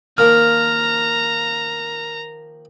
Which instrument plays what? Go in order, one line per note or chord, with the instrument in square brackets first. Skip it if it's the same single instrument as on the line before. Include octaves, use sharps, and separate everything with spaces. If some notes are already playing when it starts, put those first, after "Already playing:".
[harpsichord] D#3 F3 A#3 [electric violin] A#5 [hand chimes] F6